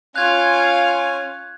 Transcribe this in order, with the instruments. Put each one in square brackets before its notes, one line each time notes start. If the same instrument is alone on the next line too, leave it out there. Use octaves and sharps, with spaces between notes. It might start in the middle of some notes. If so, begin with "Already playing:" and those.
[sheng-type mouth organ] C#4 G#5 [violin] F4 F5 [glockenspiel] F#6 G#6